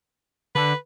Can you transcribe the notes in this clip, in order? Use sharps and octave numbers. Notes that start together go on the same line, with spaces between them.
D3 B4